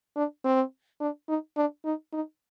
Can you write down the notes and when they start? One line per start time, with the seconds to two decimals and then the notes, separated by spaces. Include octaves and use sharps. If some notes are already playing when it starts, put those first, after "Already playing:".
0.16 D4
0.44 C4
1.00 D4
1.28 D#4
1.57 D4
1.85 D#4
2.13 D#4